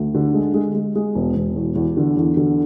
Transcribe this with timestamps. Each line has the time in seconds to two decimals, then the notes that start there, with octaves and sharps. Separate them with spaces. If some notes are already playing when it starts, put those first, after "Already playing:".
Already playing: D2
0.15 D3
0.34 G#3
0.54 G#3
0.74 G#3
0.95 G#3
1.15 E1
1.36 E1
1.56 E2
1.76 E2
1.97 D3
2.17 E2
2.37 D3